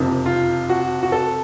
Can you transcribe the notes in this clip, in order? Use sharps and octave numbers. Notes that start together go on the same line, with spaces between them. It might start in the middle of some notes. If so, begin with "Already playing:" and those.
Already playing: F#1 F2 C3 D#3
F4
F#4
F#4
A4